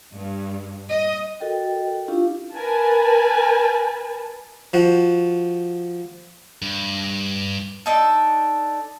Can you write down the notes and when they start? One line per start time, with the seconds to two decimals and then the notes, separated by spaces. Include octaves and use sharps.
0.14 G2
0.90 D#5
1.40 F#4 A4 A#4 D#5 G5
2.08 C#4 D4 E4 F4 G4 F5
2.55 A#4 B4 G#5 A5
4.73 F3 F#4
6.62 G2
7.86 D4 D#4 A4